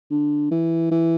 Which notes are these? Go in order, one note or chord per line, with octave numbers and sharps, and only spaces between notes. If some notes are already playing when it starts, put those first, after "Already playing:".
D3
E3
E3